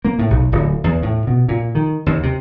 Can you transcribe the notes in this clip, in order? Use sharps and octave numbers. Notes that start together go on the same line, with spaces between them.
A#3
A2
B1
D1
E2
A2
B2
A#2
D#3
D#2
C3